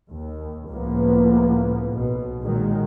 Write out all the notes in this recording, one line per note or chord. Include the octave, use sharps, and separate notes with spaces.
D#2
C#2 A2 F3 A#3 B3
B1 B2
A#2 D#3 F#3 G#3